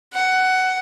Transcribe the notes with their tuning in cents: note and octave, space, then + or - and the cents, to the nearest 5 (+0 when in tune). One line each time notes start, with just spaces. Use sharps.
F#5 +15